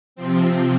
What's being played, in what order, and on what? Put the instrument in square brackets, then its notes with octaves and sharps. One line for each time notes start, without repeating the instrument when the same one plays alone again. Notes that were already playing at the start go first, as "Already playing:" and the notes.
[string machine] C3 F3 C4